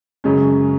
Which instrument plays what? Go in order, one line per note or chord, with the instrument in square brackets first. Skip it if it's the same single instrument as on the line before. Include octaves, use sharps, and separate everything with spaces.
[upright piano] F#2 C#3 G#3 C#4